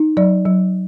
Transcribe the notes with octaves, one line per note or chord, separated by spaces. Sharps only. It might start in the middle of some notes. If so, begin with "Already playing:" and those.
Already playing: D#4
F#3 D5
F#3